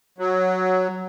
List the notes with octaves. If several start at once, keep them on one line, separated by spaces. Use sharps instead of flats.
F#3